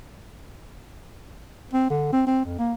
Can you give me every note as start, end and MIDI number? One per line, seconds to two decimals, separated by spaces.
1.73 1.88 60
1.90 2.08 50
2.13 2.24 60
2.27 2.43 60
2.45 2.58 41
2.59 2.73 58